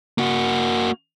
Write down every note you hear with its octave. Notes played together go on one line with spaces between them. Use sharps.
A#3 F#4